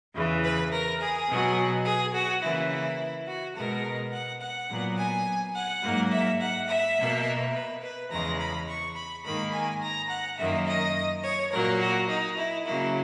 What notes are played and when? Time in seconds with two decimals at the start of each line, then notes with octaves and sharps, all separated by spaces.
0.14 E2 C#3 E3
0.43 B4
0.72 A#4
1.00 G#4
1.28 B2 F#3 B3
1.85 G#4
2.14 F#4
2.42 C#3 E3 A#3 E4
2.71 E4
3.27 F#4
3.56 B2 G#3 B3 A#4
4.13 F#5
4.41 F#5
4.69 A#2 F#3 B3
4.98 G#5
5.55 F#5
5.83 G#2 F#3 A#3
6.11 E5
6.40 F#5
6.68 E5
6.97 B2 A#3
7.53 B4
7.83 B4
8.10 E2 C#3 G#3 A#5
8.39 B5
8.68 C#6
8.95 B5
9.24 G#2 D#3 A#3 B5
9.52 G#5
9.82 A#5
10.09 F#5
10.38 F#2 D#3 A#3 E5
10.67 D#5
11.23 C#5
11.52 A#2 F#3 A#3 A#4
11.80 F#4
12.09 D#4
12.37 E4
12.65 C#3 F#3 A#3 E4